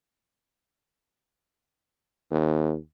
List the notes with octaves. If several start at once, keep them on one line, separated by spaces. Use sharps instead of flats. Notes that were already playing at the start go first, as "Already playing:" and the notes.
D#2